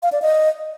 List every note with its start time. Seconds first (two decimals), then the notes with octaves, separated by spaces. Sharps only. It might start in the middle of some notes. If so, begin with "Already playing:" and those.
0.03 F5
0.12 D5
0.22 D#5